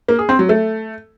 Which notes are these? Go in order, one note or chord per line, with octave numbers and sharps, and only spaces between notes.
A#3
G#4
C4
F#3
A3